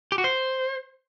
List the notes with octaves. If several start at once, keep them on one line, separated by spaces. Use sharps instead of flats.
G4
F#4
C5